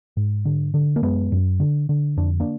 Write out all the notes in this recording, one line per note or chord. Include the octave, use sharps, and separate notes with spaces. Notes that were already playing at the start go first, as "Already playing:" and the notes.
G#2
D3
D3
A#3
F#2 G#3 B3
F#2
D3
D3
F2 D4
A#3 D4